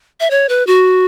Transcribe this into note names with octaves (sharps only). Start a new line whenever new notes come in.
E5
C#5
B4
F#4